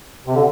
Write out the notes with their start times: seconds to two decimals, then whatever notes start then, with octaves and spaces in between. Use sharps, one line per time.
0.27 C3
0.34 D3